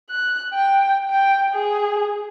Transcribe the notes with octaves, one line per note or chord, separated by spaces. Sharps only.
F#6
G5
G5
G#4